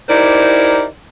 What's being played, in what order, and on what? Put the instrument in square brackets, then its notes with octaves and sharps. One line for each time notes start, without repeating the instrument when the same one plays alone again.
[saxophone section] D#4 E4 G4 A#4 C5 D5